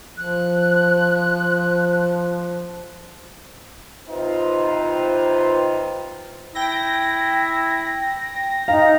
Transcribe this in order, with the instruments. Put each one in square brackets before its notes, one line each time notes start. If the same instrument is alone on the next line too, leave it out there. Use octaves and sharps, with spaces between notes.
[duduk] F3 [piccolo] F#6
[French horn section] C3 D#4 F4 B4 C5
[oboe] E4 [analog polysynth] G5 A#6
[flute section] D#4 [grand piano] F5 [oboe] A#5